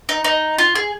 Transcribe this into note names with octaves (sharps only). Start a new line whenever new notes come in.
D#4
D#4
F4
G#4